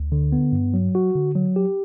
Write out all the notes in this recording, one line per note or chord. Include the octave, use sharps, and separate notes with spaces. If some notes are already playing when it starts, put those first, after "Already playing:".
Already playing: D2
D3
B3
G2
F#3
F#4
D3
F#3
G4